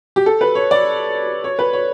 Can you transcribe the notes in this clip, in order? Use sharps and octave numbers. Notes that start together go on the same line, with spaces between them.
G4
A4
B4
C#5
D5
C#5
B4
C#5